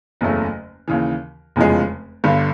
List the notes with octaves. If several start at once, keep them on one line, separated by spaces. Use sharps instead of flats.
F#1 E2 C#3 F#3 A3
D#2 C#3 E3
F1 E2 C#3 F3 G#3
G1 G2 D3